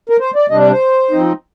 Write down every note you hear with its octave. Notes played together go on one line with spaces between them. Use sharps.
A#4
C5
D5
C3 G3 D4 D#5
D5
C5
F3 C4 D#4